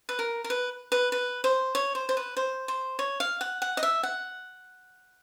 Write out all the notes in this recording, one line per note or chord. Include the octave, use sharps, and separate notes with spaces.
B4
A#4
A#4
B4
B4
B4
C5
C#5
C5
C5
B4
C5
C5
C#5
F5
F#5
F#5
D#5
E5
F#5